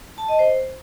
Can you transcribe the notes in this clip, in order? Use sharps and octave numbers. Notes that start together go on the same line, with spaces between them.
A5
D#5
C5